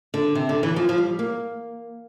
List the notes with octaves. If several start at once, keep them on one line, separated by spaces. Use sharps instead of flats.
D3
C3
D3
E3
F3
F3
G3
A#3